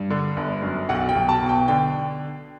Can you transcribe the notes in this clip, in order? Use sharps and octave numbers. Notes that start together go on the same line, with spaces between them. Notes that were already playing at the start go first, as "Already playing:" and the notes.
Already playing: G2
D3
G1
F#2
B1 F#5
G5
B1
A5
B2
G5
D3 G5